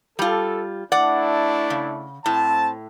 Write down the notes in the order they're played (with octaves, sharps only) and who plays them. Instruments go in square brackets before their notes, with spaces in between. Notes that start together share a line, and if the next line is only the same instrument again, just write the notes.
[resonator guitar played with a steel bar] G3 F4 [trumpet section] A4
[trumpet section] A3 D4 E4 [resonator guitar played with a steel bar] D5 F#5
[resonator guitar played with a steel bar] C#3
[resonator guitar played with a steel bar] A2 [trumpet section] C4 A5